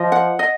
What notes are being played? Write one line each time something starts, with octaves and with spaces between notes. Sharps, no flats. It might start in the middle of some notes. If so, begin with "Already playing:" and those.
Already playing: F3 D#5
F#5
D#5